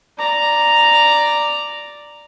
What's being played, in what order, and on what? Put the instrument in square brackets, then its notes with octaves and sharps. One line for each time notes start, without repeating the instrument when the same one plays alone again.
[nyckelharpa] D5 A#5